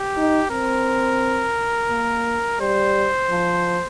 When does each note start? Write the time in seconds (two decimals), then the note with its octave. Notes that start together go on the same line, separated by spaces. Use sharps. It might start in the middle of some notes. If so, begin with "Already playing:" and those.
Already playing: G4
0.17 D#4
0.51 C4 A#4
1.90 A#3
2.59 G3 C5
3.30 F3